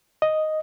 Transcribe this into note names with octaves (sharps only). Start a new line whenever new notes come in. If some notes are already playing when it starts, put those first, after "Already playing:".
D#5